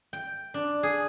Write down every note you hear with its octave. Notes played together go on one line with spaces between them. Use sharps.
G5
D4
G#4